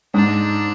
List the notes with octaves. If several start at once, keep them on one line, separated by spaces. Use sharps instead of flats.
G#2 D4